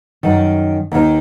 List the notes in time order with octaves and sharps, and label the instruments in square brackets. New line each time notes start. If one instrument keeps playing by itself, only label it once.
[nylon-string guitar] F#2 D#3
D#2 D#3